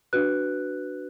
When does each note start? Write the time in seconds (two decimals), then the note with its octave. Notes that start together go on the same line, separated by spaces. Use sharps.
0.13 D4 F#4 B4 F#6